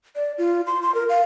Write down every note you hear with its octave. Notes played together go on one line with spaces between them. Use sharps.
D5
F4
C6
C6
A#4
F5